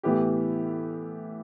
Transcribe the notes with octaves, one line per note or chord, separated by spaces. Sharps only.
A2 E3 B3 E4 G4